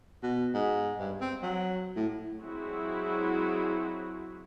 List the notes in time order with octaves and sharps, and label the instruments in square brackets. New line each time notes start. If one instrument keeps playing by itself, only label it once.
[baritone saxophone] B2
G#2
G2
C4
F#3
A2
[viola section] F#3 G#3 C4 E4 F#4